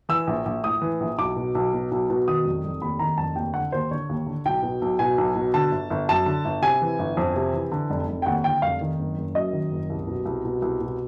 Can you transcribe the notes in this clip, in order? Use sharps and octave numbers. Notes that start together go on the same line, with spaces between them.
E3 E6
A#1
A#1
A2 D#6
E3
A#1
B1 D6
B2
B1
B2
B1
B2
D#3 D#6
F1
F1
D#2 B5
D#3 A#5
F1 A5
D#2 G5
D3 F#5
D#2 C5
D3 C#5
D#2
D3
B1 G5
B2
B1
B2 G#5
B1
B2
D3 A5
G1
G1
F#2 A5
D3
G1
C3 G#5
E3
G1
F2
C3
E3
D3
F1
F1
G5
D#2 F#5
D3 G5
F1 F5
D#3
F#1
F#1
F#2 D#5
D#3
F#1
C2
B2
C2
B2
C2
B2